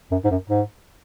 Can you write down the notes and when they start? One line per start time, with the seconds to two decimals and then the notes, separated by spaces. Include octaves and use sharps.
0.11 F#2
0.24 G#2
0.31 F#2
0.50 G#2